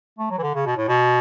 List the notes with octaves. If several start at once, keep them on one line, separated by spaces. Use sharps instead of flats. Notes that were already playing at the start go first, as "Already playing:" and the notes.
A3
F#3
E3
D3
C#3
B2
A2
B2